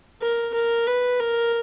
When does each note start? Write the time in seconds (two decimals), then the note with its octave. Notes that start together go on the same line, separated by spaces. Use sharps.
0.21 A#4
0.54 A#4
0.87 B4
1.20 A#4